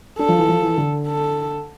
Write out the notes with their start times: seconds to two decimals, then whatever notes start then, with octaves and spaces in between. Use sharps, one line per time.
0.19 D4 A4
0.29 F3
0.38 E3
0.48 F3
0.62 E3
0.78 D3
1.07 A4